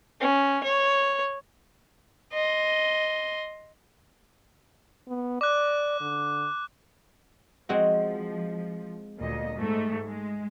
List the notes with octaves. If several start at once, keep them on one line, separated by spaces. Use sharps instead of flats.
C#4
C#5
D#5 C6
B3
D5 D6 F#6
D3
F3 G#3 C4 F#4
D2 A#2 D#5
G#2 A3
G#3